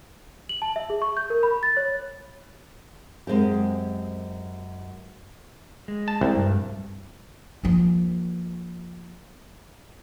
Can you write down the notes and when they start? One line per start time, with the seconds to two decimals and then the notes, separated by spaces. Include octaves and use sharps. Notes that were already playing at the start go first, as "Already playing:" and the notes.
0.49 F#7
0.62 A5
0.76 E5
0.90 G#4
1.02 C#6
1.17 G6
1.30 A#4
1.43 B5
1.63 A6
1.77 C#5
3.27 F#2 G#3 C4 G4
5.88 G#3
6.08 A5
6.21 C2
6.37 G2
7.63 F3 A#3